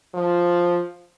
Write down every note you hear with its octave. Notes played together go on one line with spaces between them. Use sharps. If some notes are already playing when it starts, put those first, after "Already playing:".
F3